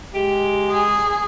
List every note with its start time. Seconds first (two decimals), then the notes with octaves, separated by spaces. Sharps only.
0.14 G#3 G4
0.70 G#4